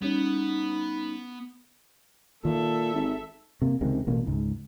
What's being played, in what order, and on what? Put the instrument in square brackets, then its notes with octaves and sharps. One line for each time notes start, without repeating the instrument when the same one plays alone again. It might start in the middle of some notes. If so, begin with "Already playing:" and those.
[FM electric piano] G3 C#4 [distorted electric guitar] B3 [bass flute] D#4
[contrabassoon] A#2 [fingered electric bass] D#3 [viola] A4 E5
[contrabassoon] G#1
[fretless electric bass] C3 A#3
C#2 C3 D#3 G#3
A1 B2 A#3
C#2 G#2